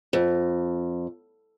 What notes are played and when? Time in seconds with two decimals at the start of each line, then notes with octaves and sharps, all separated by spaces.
0.13 F2